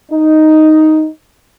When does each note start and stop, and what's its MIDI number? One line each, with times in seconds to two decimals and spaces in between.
0.12 1.07 63